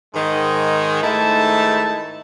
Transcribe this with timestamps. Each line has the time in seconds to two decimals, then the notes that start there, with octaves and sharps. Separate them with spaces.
0.14 G#2 D#3 G#3
1.03 G#2 D#3 A3 D#4 E4 A5